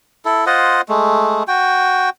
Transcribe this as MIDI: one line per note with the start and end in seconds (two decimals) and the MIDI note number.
0.25 0.45 64
0.25 0.45 69
0.47 0.81 65
0.47 0.81 72
0.47 0.81 75
0.47 0.81 78
0.89 1.43 56
0.89 1.43 57
1.48 2.10 66
1.48 2.10 79